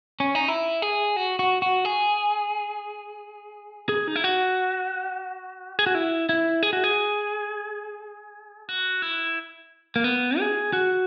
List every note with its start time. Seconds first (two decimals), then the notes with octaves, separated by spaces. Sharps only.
0.20 C#4
0.35 D#4
0.48 E4
0.82 G#4
1.16 F#4
1.39 F#4
1.62 F#4
1.85 G#4
3.89 G#4
4.08 D#4
4.16 E4
4.24 F#4
5.79 G#4
5.86 F#4
5.95 E4
6.29 E4
6.63 G#4
6.73 F#4
6.84 G#4
8.69 F#4
9.02 E4
9.96 A#3
10.04 B3
10.39 G#4
10.73 F#4